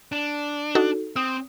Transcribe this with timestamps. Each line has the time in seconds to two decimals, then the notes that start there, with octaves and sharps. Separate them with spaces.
0.12 D4
0.75 D#4 F#4 A4
1.16 C4 D#6